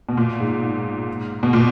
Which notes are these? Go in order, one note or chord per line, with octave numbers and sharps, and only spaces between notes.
B2
A#2
G#2
B2
A#2